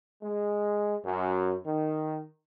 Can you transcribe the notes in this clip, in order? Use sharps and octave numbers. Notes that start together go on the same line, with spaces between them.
G#3
F#2
D#3